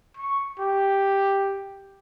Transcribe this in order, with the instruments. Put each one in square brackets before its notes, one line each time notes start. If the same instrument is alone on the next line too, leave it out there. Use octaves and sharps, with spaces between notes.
[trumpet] C#6
G4